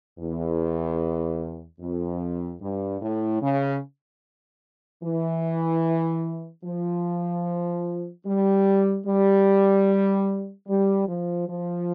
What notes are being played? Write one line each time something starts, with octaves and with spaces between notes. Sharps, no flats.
E2
F2
G2
A2
C#3
E3
F3
G3
G3
G3
F3
F3